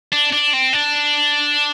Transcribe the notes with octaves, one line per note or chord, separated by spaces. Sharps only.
D4
D4
C4
D4